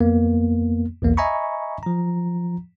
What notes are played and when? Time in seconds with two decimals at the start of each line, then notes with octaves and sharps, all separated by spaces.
0.01 F2 A#3 B3
1.02 B1 E2 A#3
1.17 D#5 E5 G#5 A#5 B5 C#6
1.83 F3 A#5